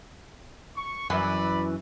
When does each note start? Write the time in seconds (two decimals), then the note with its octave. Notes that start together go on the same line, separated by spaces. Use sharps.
0.76 C#6
1.10 F#2 E3 D5 B5